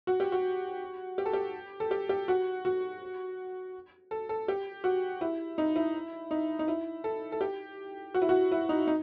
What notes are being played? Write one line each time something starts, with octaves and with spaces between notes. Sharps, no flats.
F#4
G4
F#4
G4
A4
G4
A4
G4
G4
F#4
F#4
A4
A4
G4
F#4
E4
D#4
E4
D#4
D#4
E4
A4
A4
G4
F#4
E4
F#4
E4
D#4
D#4